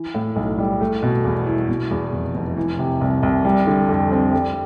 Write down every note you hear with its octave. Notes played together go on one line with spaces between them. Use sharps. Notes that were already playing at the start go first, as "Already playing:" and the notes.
Already playing: E3
A2
B1
G3
A3
B2
E2
E4
B2
E2
F1
F1
E3
C3
C2
C2
G3
D3
F2
C4
G3